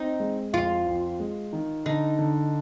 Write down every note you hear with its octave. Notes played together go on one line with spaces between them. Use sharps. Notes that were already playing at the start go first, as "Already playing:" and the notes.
Already playing: C4 D#4
G#3
F2 F4
F2
G#3
D#3
D3 D#4
D3